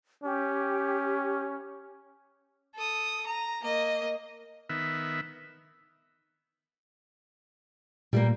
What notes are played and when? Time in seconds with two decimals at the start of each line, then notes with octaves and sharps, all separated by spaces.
0.24 C#4 G4
2.75 A4 D#6
3.26 A#5
3.61 A#3 D#5
4.69 D#3 B3 E5
8.13 A#2 G3 A3 A#3